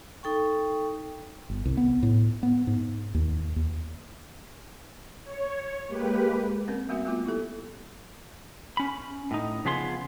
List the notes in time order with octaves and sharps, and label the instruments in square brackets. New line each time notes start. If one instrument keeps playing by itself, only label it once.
[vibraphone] D#4 A4 G5 C#6
[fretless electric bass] G1
C2
B3
A2
B3
G#2
D#2
D#2
[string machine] C#5
G#3 A#3 G4 B4
[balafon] A#3 C4 C#4 A#4
G3 A#3 B3 F#4 E5
G3 A3 B3 F4
E4 G4 A4
[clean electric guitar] C#4 B5
A2 D#4
C#3 F3 B3 G#4 C6